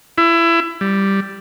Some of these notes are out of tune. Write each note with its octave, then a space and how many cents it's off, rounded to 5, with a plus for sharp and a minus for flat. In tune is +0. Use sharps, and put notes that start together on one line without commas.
E4 +25
G3 +0